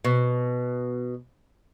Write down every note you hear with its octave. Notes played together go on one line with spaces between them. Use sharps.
B2